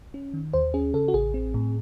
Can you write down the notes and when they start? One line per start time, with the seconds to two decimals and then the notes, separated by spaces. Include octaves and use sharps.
0.14 C#4
0.34 D#3
0.53 D#2 C5
0.74 C#4 G#4
0.94 C#3 A4
1.08 F#4
1.14 A1 G#4
1.34 C4
1.54 A2